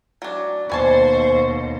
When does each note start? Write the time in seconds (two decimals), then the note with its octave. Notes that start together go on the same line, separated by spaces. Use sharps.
0.22 F#3 D4
0.70 D#2 B2 B4 C5 G#5 A5 C#6